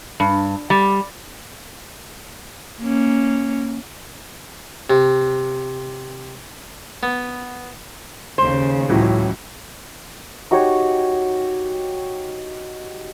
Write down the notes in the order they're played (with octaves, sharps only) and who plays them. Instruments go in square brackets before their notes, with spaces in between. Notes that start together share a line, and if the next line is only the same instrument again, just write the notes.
[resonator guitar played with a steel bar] G2
G3
[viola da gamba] A#3 C#4
[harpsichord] C3
B3
[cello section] D#2 C#3 [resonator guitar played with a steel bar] C5
[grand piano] C#2 E3 F#3 [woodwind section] A2
[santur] D#4 F#4 G4 C#5